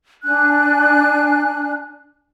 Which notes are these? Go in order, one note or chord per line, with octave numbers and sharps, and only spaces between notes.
D4 G#5 F#6